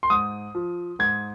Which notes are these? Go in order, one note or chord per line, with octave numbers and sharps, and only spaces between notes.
C6
G#2 D#6
F3
G#2 G#6